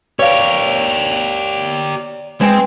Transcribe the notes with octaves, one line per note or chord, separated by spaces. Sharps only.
G4 A#4 B4 C#5 D5 F5
G#3 C4 B4 C5 G5 G#5